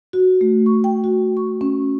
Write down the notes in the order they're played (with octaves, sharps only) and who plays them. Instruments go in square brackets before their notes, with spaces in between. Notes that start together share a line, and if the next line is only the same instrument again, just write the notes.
[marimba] F#4
A3
C#6
G5
F#4
C#6
C#4